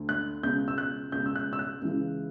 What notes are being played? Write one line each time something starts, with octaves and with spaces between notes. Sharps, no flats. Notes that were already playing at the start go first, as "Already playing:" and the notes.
Already playing: D2 D3
F#6
C#2 B2 G6
E6
F#6
C#2 B2 G6
E6
F#6
E6
F#6
C#2 C#3 E3